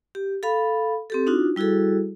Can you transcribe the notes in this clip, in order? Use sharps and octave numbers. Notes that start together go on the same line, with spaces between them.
G4
A4 F5 B5
C4 G4 A4
D4 D#4 F4 F#4
G3 E4 F#4 G#4 A4